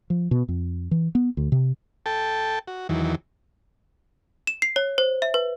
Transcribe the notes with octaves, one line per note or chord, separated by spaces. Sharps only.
F3
B2
F2
E3
B3
D2
C3
A4 G5 A5
F#4
E2 D#3 E3 F#3
E7
C7
C#5
C5
E5
B4